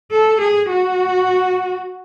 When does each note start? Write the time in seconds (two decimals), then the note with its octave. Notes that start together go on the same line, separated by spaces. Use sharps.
0.12 A4
0.41 G#4
0.69 F#4